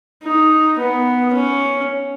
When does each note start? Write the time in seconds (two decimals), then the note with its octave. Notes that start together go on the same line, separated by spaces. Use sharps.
0.24 D#4
0.78 B3
1.33 C#4